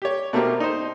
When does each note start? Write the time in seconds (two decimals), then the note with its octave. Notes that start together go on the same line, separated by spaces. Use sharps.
0.02 G4 C#5
0.33 B2 A3 A#3 C4 G4 A#4
0.60 D#4 C5